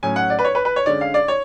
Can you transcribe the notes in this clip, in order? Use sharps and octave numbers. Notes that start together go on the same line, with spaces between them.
A2 F#3 C#4 G#5
F#5
D5
B4
C#5
B4
B4
C#5
D3 G#3 C#4 D5
F5
D5
C#5